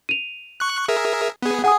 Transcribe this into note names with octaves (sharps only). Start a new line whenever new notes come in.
D#7 F7
C#6 F#6
G#4 A#4 E5
B3 G#4
G#4 F#5 G#5 D#6